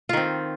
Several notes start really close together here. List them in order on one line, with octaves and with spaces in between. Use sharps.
F4 D#3 C4